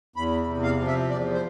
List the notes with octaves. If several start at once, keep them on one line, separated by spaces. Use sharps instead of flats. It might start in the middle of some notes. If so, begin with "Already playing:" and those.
E2 B5
C3
F5
F3
E5
E2 D5
C5